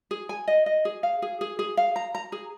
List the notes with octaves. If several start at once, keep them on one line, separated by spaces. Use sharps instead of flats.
G#4
G#5
D#5
D#5
G#4
F5
G#4
G#4
G#4
F5
A#5
A#5
G#4